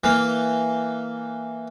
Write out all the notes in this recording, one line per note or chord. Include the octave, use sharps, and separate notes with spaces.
E3 A#3